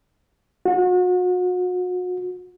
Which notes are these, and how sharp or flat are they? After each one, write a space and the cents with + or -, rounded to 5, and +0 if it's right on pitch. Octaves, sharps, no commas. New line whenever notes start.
F#4 -35